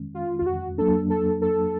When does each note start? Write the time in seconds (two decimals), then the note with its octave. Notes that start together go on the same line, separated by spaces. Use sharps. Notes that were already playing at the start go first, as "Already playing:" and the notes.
Already playing: D#3 G#3 C#4
0.14 F4
0.39 F4
0.46 F#4
0.78 F#3 A#3 D4 A4
1.10 A4
1.42 A4